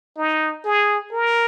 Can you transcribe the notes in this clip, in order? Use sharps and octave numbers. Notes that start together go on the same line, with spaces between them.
D#4
G#4
A#4